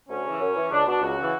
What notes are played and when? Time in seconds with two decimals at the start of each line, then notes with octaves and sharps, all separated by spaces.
0.09 D2 C#4
0.24 C#3 E3
0.40 F#2
0.56 E3
0.70 C#2 D4
0.86 B2 D4
1.02 C#2 F#4
1.18 C#3 E3